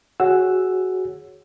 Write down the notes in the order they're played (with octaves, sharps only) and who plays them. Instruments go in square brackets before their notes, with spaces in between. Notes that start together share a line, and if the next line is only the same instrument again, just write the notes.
[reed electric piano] F#4 G#4 C#5 F#5 E6